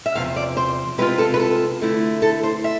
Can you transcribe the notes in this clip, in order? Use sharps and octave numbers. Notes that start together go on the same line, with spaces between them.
E5
E2 C3 F3 F5
D5
C5
C3 G#3 C4 F4 B4
A4
B4
A4
D3 A3 E4
A4
C5
E5